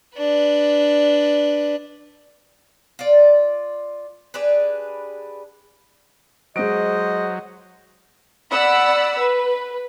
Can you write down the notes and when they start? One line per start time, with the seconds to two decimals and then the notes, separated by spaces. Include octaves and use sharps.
0.17 D4 B4
2.99 F4 D5
4.34 D4 G4 G#4 B4
6.56 F#3 G#3 C5 D#5 D7
8.51 D5 F#5 B5 E6
9.19 B4